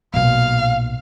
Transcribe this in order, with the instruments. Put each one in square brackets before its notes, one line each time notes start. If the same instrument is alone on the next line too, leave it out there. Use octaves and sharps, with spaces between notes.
[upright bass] B1 A#2 [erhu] F5